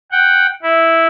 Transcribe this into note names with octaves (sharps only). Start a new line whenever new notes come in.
F#5 G5
E4